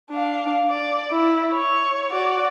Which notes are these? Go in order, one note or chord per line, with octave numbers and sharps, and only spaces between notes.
D4 F5
D5
E4
C#5
F#4 D5